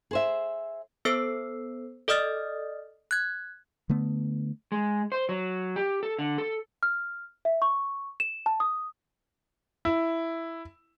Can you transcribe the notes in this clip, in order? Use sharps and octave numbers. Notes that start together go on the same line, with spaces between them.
G#4 C5 E5
B3 A4 C5 E6 C7
A4 D5 D#5 D#6 F6 A6
F#6 G#6
D3 A3 B3
G#3
C5
F#3
G4
A4
D3
A4
F6
E5
C#6
E7
A5
D#6
E4